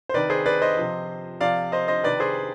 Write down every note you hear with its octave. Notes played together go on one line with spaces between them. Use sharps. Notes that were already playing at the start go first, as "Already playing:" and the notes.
C5
C3 D#3 B4 D5
G#4 C5
B4 D5
C5 D#5
C3 F3
C3 F3 D5 F5
C5 D#5
C5 D#5
C3 D#3 B4 D5
G#4 C5